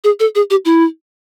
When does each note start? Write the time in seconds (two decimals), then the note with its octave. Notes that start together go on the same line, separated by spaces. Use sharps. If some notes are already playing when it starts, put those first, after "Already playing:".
0.04 G#4
0.20 A4
0.35 G#4
0.50 G4
0.65 E4